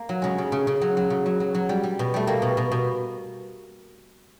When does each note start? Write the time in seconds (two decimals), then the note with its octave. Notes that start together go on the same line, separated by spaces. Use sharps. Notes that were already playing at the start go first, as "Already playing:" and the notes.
Already playing: A#3
0.09 F#3
0.22 C#3 G#3
0.38 C#3
0.52 C#3
0.67 C#3
0.81 F#3
0.97 F#3
1.10 C#3
1.26 F#3
1.40 F#3
1.55 F#3
1.69 G3
1.83 G3
1.99 B2
2.14 G3 A3
2.27 G3 A#3
2.42 B2
2.57 B2
2.72 B2